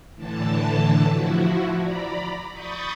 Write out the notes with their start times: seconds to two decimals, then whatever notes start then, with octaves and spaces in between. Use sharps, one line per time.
0.15 A2 D3 E3 A5
1.10 F3 E4 F#4
1.77 D5 A#5 B5
2.52 B5 C#6 D#6 G6 A6